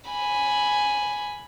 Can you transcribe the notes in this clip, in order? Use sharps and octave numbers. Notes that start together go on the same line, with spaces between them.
G#5 B5